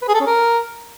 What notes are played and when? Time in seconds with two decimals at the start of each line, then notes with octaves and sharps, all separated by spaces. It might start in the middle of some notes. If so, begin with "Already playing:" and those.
0.02 B4
0.08 G#4
0.14 A4
0.20 C#4
0.26 A#4